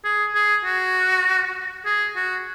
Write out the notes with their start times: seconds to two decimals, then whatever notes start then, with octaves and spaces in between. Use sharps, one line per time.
0.04 G#4
0.35 G#4
0.65 F#4
1.86 G#4
2.16 F#4